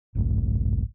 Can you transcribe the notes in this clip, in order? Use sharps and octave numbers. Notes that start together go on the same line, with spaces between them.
G#1 C#2 F#2 A2